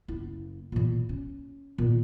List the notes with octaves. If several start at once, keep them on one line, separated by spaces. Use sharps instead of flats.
F#1 E4
A#2 E3
C#4
A#2 D#3